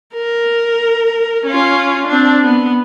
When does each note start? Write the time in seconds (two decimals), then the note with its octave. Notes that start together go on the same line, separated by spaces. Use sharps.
0.14 A#4
1.46 C#4 F4
2.08 C4 D4
2.43 B3